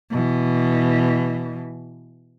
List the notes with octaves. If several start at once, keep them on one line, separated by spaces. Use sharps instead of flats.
B2 E3